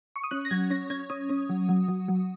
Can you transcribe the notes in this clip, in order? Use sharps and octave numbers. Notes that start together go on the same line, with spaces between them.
C#6
D#6
C#4 F#6
A#6
F#3 G#6
C#4 A#6
C#4 G#6
C#4 D#6
C#4
F#3
F#3
F#3
F#3